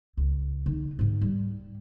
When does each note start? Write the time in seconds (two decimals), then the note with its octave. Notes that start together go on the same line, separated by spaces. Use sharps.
0.17 C#2
0.66 D3 D#4
0.99 G#2 D#3
1.21 G3